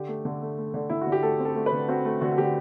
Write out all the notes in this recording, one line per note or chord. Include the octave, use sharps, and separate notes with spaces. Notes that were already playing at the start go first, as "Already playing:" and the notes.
Already playing: D3 G4
A3
D3
A3
A3
D3
D3 E4
F#4
D3
G4
A3 A4
C4
A4
A3
B4
D3
C4 F#4
A3
D3 F#4
F#4
D3 G4